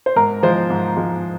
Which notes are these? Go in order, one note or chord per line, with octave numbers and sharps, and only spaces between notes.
C5
G#2 A#4
F3 G#3 C5
G#2
F3 G#3